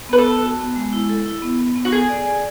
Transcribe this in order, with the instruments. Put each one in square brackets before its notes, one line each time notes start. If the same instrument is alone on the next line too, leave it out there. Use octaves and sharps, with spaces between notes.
[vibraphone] B3 [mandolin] B4
[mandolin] A4
[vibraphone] B3
F#4
B3
G#3
E4
A4
E4
B3
B3
B3
[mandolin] F#4
[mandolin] G#4 [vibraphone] A4
[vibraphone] D5
D5